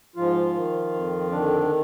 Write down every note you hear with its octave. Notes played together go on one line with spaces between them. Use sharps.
G#2 F3 F4
D#3
F2
D3 D#3 D4